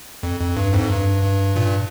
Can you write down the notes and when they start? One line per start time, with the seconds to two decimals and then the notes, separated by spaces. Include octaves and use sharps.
0.23 F2
0.40 F2
0.57 G2
0.73 F2 G#2
0.90 G2
1.23 G2
1.56 G2 A#2